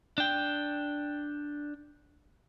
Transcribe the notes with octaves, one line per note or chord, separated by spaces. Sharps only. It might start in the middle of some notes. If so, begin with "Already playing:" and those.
D4 G5